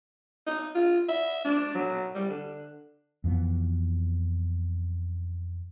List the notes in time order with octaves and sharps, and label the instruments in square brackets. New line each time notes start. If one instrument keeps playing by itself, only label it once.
[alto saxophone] D#4
F4
E5
D4
F#3
G3
D3
[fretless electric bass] F2 E3 B3